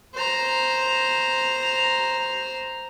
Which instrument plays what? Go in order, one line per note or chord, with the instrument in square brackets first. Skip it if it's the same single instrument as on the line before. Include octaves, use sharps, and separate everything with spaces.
[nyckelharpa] C5 A#5